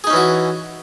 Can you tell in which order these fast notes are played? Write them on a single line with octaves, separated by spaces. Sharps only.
G#4 D#4 C#4 E3 F#4